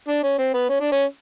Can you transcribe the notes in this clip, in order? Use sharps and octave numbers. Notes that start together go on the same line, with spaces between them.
D4
C#4
C4
B3
C#4
D4
C#4